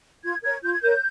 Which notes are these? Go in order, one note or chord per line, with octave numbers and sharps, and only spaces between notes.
F4 G#6
A#4 C#5 G#6
F4 G6
G#6
A#4 C#5 G6